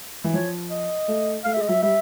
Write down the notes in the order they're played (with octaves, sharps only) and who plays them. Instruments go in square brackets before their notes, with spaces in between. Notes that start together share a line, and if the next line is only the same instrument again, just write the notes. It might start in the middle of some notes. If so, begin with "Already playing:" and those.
[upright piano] E3
[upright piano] F3 [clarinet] C#5
[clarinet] D#5
[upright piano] A3
[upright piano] A3 [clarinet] F5
[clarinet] E5
[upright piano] G#3
[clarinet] D#5
[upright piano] F#3 [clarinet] E5
[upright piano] G3 [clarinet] E5